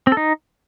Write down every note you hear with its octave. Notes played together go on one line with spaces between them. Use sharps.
C4
A4
D#4